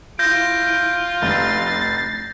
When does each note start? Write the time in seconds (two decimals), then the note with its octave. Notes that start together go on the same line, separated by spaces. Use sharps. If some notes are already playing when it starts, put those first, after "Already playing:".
0.19 E4 F4 G6 A#6 D7
1.22 F1 A6 C7